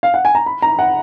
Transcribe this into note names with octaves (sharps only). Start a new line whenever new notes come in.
F5
F#5
G#5
A#5
B5
A#5
F#5